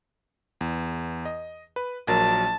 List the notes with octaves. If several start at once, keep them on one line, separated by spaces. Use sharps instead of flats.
E2
D#5
B4
A#1 F#3 A#4 A5